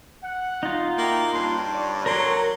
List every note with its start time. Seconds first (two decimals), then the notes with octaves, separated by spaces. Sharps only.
0.23 F#5
0.63 D#4 F4
0.98 A#3 E4 F#4 G5
1.33 G2 C#4 C6
1.72 C#5 D5
2.06 F#3 A4 A#4 C#5 C6